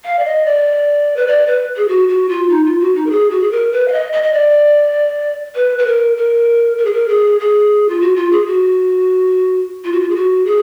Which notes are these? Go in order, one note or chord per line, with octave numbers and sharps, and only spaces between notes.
F5
D5
D#5
D5
B4
D5
B4
G#4
F#4
F#4
F4
D#4
F4
F#4
D#4
A#4
G#4
F#4
G#4
A#4
B4
F5
D#5
D#5
D#5
D5
B4
B4
A#4
A#4
A#4
G#4
A#4
G#4
G#4
F4
F#4
F4
G#4
F#4
F4
F#4
F4
G#4
F#4
G#4